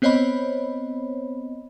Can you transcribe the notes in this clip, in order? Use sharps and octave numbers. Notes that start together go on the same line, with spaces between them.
B3 C4 C5 C#5 D#5 B5